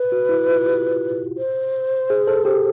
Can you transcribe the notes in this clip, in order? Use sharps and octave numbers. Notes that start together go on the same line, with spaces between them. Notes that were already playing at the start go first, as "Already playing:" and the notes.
Already playing: B4
F#4
E4
F4
G4
C5
G#4
A4
G4